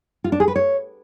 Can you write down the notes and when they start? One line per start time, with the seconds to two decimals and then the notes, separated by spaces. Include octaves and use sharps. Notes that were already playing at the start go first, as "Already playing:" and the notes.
0.24 F4
0.32 D4
0.40 G#4
0.48 B4
0.56 C#5